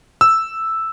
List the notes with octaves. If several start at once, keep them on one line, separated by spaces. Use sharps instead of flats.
E6